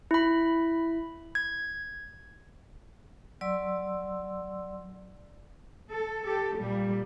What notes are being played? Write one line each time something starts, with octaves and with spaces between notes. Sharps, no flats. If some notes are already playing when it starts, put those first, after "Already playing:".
E4 B5
G#6
F#3 D5 C6 E6
A4
G4 A4
A#2 G3